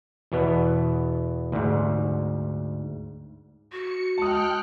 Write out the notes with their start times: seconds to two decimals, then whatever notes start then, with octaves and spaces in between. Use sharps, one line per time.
0.32 E2 B2 B3
1.52 D2 G#2
3.72 F#4 C#7
4.18 G#3 G5 A5 D#6 F6 F#6